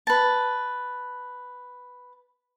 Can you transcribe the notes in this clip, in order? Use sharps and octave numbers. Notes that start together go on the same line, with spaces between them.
B4 A5